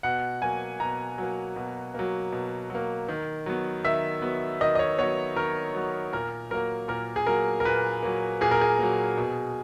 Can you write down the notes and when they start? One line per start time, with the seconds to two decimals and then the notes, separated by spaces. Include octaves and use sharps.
0.03 B2 F#5
0.42 F#3 A#3 G#5
0.80 B2 A#5
1.18 F#3 A#3
1.56 B2
1.94 F#3 A#3
2.32 B2
2.70 F#3 A#3
3.08 D#3
3.46 F#3 B3
3.84 D#3 E5
4.22 F#3 B3
4.61 D#3 D#5
4.75 D#5
4.79 C#5
4.98 F#3 B3 C#5
5.36 D#3 A#4
5.75 F#3 B3
6.13 A#2 A#4
6.50 F#3 A#3 A#4
6.88 A#2 A#4
7.16 G#4
7.26 F#3 A#3 A#4
7.60 A#4
7.65 A#2 B4
8.03 F#3 A#3
8.41 A#2 G#4
8.51 A#4
8.61 G#4
8.79 F#3 A#3
9.17 B2